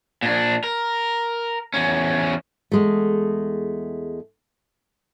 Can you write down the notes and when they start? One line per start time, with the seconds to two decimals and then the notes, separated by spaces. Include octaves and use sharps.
0.22 A#2 D4
0.64 A#4
1.74 E2 C#4
2.72 E2 G#3 A3